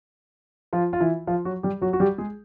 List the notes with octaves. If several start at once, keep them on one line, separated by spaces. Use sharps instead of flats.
F3 F4
F4
E3 E4
F3 F4
F#3 F#4
G3 G4
F#3 F#4
F#4
G3 G4
G#3 G#4